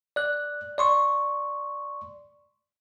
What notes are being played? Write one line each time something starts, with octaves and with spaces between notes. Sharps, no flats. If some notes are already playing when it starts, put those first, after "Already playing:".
D5 F#6
D5 C6 C#6